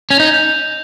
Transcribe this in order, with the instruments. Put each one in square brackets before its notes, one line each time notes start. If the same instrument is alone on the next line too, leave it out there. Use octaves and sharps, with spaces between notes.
[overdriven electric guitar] C#4 [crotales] F7
[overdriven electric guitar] D#4 [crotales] G6
[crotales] G6